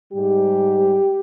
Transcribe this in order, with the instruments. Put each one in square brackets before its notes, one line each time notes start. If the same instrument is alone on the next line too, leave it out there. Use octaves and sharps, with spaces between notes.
[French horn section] G#2 G3 G4